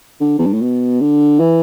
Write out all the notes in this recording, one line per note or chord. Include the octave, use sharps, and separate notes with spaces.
D3
E2
G2
A2
B2
D3
E3